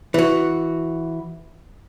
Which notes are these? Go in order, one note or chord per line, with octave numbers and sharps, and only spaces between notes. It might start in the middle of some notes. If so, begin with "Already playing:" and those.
E3 F#4